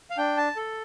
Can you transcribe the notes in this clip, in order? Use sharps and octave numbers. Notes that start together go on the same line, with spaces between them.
F5
D4 G5
A5
A4